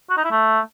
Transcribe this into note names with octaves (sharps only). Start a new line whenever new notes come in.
F#4
D#4
E4
A3